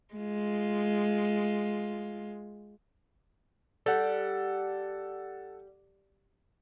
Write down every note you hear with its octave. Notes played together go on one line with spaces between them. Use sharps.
G#3 F4
G3 A4 F#5